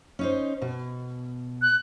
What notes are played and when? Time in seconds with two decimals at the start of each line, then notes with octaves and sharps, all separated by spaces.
0.19 C#4 D#4 C5
0.62 B2
1.62 F#6